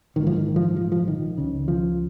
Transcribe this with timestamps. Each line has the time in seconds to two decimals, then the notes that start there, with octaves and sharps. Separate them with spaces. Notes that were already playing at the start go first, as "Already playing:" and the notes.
0.16 A#1 G#2 D#3
0.27 F3
0.36 D#3
0.56 F3
0.76 F3
0.92 F3
1.08 D#3
1.38 C#2 C#3
1.68 F3